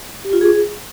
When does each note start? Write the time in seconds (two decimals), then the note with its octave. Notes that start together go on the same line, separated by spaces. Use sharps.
0.25 G4
0.33 F4
0.41 G#4